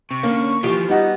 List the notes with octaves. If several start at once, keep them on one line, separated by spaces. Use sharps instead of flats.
C3 C#6
D3 A#3 C#4
E3 F3 F4 G4
G3 B3 D#4 F#4